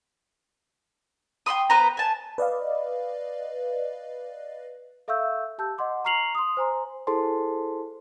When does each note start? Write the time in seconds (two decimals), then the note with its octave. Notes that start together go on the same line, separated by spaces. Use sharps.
1.46 G5 B5 C6 D#6
1.70 B3 B4 C5 A#5
1.97 G#5 A5
2.38 B4 D5 D#5 F5
5.08 A4 E5 F5 C#6 E6 G6
5.58 G4 A5 E6 G6
5.78 D#5 F#5 C6 D6
6.05 A#5 C#6 F6 C7 F7 F#7
6.35 C6 D#6
6.57 C5 G#5 A#5 C6
7.07 E4 G#4 A4 C5 A5 C6